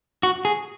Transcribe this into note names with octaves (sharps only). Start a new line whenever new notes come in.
F#4
G#4